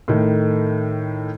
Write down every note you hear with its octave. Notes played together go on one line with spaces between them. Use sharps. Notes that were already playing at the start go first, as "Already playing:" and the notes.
A2 D#3